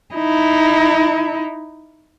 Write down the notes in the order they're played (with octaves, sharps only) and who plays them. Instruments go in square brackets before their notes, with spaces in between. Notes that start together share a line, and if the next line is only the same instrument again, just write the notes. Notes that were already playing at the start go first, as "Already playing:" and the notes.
[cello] D#4 E4